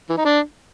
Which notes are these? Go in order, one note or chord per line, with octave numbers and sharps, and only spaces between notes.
E3
D#4
D4